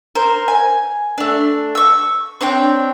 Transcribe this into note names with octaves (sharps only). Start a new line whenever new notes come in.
A#4 C5
G#5
A3 D4
C#6 E6
C4 D4 C#5 G5